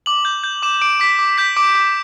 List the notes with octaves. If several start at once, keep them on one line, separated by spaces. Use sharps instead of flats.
D6 F#7
G6
G6
D6 E7
D6 D7
D6 B6
D6
G6 B6
D6 D7
D6